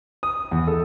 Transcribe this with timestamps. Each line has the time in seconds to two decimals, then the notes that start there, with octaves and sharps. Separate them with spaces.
0.23 D#6
0.51 E2
0.67 A4